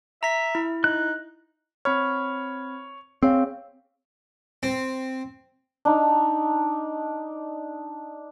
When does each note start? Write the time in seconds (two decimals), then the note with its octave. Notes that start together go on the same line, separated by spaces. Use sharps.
0.23 E5 A#5 B6
0.55 E4
0.84 D#4 F#6
1.85 C4 C#5 B5 F6
3.23 C4 G#4 C#5 F5
4.63 C4
5.85 D4 D#4